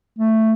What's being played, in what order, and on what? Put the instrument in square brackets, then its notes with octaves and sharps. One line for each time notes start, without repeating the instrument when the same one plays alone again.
[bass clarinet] A3